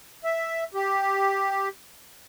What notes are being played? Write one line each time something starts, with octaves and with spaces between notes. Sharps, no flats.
E5
G4